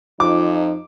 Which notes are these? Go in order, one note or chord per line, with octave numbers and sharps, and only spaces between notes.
F2 F3 D#4 D6